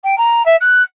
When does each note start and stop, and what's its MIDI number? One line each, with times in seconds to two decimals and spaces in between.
0.04 0.17 79
0.17 0.45 82
0.45 0.55 76
0.60 0.81 90